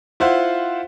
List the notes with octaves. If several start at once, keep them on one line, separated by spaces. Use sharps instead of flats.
E4 F4 C5 F#5